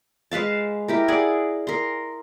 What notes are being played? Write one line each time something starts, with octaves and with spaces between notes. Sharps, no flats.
G#3 B4 F5 A5
E4 G4 A#4
G#4 D5 F#5 G#5
A#4 C6